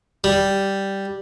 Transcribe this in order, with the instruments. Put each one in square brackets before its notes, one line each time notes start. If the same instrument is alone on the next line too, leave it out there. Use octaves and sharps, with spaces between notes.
[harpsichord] G3